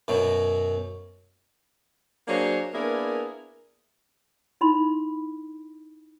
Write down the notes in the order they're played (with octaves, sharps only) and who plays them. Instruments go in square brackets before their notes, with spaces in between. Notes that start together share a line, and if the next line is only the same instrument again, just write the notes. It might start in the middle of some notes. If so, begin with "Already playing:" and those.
[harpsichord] F#2 B2 F#3
[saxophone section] F#3 A#3 D4 G#4 C5 C#5
A#3 B3 D4 E4 G#4 A#4
[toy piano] D#4 E4 B5 C6